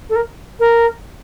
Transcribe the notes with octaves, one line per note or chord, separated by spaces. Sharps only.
A4
A#4
A#4